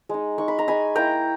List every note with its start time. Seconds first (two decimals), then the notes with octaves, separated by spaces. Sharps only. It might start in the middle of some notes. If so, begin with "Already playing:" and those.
0.09 G#3 D#4
0.38 G#3 D#4 C#6
0.48 B5
0.59 A#5
0.68 G#3 D#4 G#5 B5
0.95 A#3 E4 G5 A#5